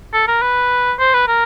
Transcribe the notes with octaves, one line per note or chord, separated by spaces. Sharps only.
A4
A#4
B4
C5
B4
A#4